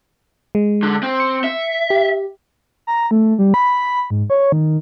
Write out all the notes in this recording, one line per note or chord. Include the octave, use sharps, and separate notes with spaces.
G#3
D3
C4
C#7
E5
G4
A#5
A3
G3
B5
G#2
C#5
D#3